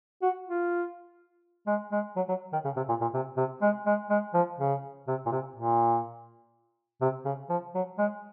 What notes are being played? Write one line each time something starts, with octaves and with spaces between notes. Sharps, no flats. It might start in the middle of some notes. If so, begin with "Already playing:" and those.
F#4
F4
G#3
G#3
F#3
F#3
D#3
C#3
C3
A#2
A#2
C3
C3
G#3
G#3
G#3
F3
C#3
C3
A#2
C3
A#2
C3
C#3
F3
F#3
G#3